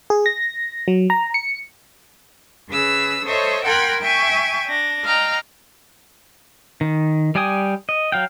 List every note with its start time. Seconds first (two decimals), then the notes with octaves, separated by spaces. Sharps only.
0.10 G#4
0.26 A#6
0.88 F#3
1.10 A#5
1.34 C#7
2.70 C#3 G#4 B4 E6
3.25 A4 C5 C#5 D#5 E5
3.66 A#4 F#5 G5 B5 C6 G#6
4.02 E5 G5 G#5 C#6
4.67 D4 A#6
5.04 D#5 F5 G5 A#5
6.81 D#3
7.35 G3 D5 G5 G#5 D#6
7.89 D#5
8.12 F#3 F5 G5